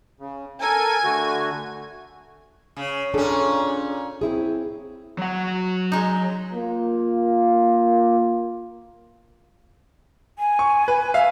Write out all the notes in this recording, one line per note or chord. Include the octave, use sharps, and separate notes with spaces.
C#3
A4 A#4 G#5
D3 A3 F#4
C#3
A#2 C#4 D4 G#4 A4
C4 E4 G#4
F#3 F#5
G#3 D#4
A#3 F4
G#5
C#6
B4
E5 F5